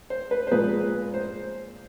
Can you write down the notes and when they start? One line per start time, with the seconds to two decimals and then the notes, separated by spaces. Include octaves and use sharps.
0.10 C5
0.31 B4
0.47 C5
0.51 A#2 F3 G#3 B4
1.14 C5